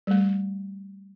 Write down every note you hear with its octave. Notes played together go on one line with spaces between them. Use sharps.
G3 A3